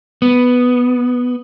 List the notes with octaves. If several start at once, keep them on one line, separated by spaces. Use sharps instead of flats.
B3